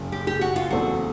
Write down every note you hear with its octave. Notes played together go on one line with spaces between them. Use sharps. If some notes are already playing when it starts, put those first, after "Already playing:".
Already playing: F#1 F#2 C#3
G4
G4
F#4
F4
E2 C#3 E3 A3 C4 F#4